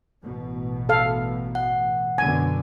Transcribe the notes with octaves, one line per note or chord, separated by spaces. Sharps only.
A1 B2
A4 F5
F#5
F#2 B2 D3 G#5